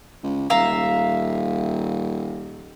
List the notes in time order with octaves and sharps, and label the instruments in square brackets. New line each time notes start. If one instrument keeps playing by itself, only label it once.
[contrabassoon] C#2
[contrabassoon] D#1 [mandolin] E5 F5 A#5